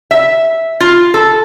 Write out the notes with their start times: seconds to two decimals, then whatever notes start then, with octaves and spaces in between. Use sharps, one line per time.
0.11 E5
0.80 F4
1.14 A4